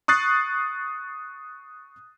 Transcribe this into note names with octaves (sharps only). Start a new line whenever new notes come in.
C#6 D#6 F#6 A6 C7